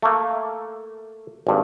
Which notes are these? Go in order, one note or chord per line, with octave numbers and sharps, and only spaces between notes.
A3 A#3
G#1 G2